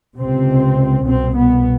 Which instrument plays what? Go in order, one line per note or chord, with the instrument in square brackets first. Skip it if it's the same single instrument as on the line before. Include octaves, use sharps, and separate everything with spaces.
[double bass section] C#2 C3 C4
C2 B2 C4
B3